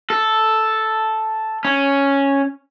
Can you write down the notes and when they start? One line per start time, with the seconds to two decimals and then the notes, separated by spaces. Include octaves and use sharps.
0.10 A4
1.65 C#4